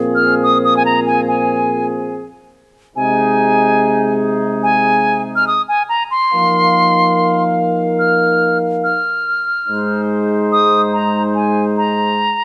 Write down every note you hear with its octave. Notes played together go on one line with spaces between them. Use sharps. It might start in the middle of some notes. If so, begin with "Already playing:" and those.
Already playing: A#2 F3 C4 F4 G#4
F6
D#6
D#6
G#5
A#5
G#5
G#5
C3 G#3 D#4 G#4 G#5
G#5
F6
D#6
G#5
A#5
C6
F3 A#3 D#4 A#4 F5
F6
F6
G#2 G#3 D#4 C5
D#6
A#5
G#5
A#5